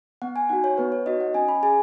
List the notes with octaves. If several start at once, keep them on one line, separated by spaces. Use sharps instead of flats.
B3 F#5
G#5
D#4 F#4 F#5
C#5
B3 B4
C#5
D#4 F#4 D#5
F#5
C#4 G#5
B5
G#4 G#5